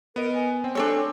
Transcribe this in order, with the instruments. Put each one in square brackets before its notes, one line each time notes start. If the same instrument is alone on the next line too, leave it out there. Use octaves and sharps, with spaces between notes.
[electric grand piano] B3 D#5 D7 [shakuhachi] A#4
[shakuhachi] G#5
[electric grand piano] C4 [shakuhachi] G5
[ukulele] D4 A4 C#5 [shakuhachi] G#5